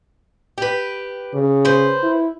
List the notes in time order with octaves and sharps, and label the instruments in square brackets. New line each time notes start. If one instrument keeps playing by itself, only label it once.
[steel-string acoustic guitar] G4 B4
[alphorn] C#3
[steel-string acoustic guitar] B4 C5
[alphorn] E4